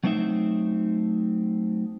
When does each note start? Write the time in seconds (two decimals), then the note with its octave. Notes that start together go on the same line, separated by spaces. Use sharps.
0.04 F#3 A3 C4 D#4 E5